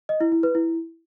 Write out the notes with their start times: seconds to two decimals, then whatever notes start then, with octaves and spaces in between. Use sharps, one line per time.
0.09 D#5
0.21 E4
0.32 E4
0.43 B4
0.55 E4